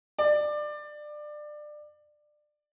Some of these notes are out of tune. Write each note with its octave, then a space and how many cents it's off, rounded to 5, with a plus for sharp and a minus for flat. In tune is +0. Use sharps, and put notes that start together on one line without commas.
D5 +25